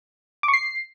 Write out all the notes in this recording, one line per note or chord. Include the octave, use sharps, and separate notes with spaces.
D6
C#6
C7